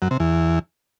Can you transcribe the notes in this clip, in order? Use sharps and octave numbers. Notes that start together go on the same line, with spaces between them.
F#2
C3
E2